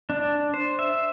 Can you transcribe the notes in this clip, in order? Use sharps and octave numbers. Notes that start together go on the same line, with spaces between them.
D4
C5
E5